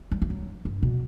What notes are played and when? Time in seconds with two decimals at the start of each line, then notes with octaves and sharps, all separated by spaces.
0.11 G3
0.22 E3
0.30 F#3
0.65 G2
0.83 B2